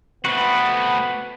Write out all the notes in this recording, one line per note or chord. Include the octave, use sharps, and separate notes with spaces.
A3 B3 C4 F#4 B4